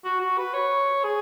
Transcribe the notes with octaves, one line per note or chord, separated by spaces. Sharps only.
F#4
F#4
B4
C#5
G#4